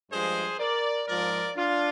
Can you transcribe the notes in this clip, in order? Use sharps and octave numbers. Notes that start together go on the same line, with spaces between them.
G2 F3 G#3 G#4 C5
A#4 D5
G#2 F3 G#3 A#4 D5
D4 F4